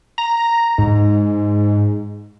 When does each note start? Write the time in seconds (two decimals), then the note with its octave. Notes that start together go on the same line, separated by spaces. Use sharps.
0.18 A#5
0.78 G#2